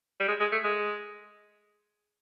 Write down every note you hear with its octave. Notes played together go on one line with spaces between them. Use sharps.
G3
G#3
G#3
A3
G#3